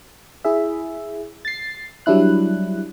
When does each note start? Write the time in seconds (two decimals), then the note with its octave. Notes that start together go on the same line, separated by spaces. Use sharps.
0.45 E4 G#4 E5
1.45 A6 C7
2.06 F#3 G3 D4 E4 F#6